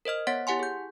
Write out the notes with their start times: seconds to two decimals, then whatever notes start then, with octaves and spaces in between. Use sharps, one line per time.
0.05 A#4 C5 D#5 F6
0.27 B3 C#5 F#5 A6 B6
0.47 E4 G4 F#5 G#5 C6
0.59 G#4 G6